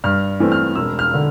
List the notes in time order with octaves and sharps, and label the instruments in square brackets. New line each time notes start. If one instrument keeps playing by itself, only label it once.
[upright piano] G2 F6
E3 A3 C4
F6
E1 E6
F6
D3